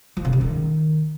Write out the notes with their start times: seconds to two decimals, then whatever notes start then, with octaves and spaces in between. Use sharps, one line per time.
0.17 F3
0.25 C3
0.33 C#3
0.41 D#3